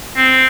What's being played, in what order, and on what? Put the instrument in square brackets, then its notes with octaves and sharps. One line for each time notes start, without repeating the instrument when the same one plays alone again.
[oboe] C4